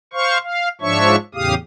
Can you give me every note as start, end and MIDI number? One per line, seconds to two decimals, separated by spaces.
0.13 0.38 72
0.13 0.38 77
0.13 0.38 85
0.43 0.69 77
0.81 1.16 44
0.81 1.16 53
0.81 1.16 62
0.81 1.16 73
0.81 1.16 76
0.81 1.16 85
1.35 1.54 40
1.35 1.54 45
1.35 1.54 49
1.35 1.54 67
1.35 1.54 77
1.35 1.54 87